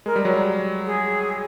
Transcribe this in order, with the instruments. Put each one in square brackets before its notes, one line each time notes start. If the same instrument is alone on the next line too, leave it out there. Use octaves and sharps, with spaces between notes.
[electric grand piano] G#3 [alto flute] A#4
[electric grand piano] G3
F#3
G3
[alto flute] G#4